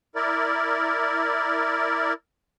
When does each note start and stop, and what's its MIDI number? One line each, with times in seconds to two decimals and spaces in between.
0.15 2.13 64
0.15 2.13 70
0.15 2.13 74